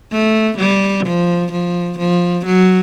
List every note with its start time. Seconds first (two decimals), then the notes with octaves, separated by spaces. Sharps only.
0.12 A3
0.58 G3
1.06 F3
1.52 F3
1.99 F3
2.46 F#3